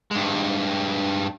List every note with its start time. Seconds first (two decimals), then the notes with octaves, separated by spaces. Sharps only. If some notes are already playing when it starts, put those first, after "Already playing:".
0.11 G2 G#3